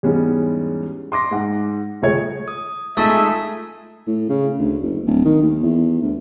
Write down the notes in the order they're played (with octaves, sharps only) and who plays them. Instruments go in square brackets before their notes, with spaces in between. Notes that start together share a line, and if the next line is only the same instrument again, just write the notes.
[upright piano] E2 G#2 G3 G#3 B3 C#4
C6 D6 A#6
G#2 F#5
D#1 C#2 A3 G#4 C#5 G#6
[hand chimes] D#6
[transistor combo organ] G#3 D#4 [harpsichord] A3 [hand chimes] F4 A4 A5 [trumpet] E5
[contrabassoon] A2
C#3
D2
F#1
D1
D#3
D#2
E2
D2